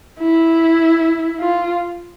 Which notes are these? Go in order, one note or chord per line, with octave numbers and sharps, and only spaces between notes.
E4
F4